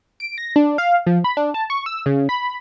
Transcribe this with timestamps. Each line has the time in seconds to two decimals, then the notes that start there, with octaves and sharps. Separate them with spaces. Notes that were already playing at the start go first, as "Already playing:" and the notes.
0.20 D7
0.38 A#6
0.56 D4
0.78 F5
1.07 F3
1.24 B5
1.37 D4
1.54 A5
1.70 C#6
1.86 E6
2.06 C#3
2.29 B5